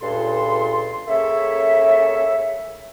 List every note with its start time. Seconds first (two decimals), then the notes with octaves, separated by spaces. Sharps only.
0.01 C#2 G2 A#2 A4 C6
1.08 C#3 A#3 A4 C#5 E5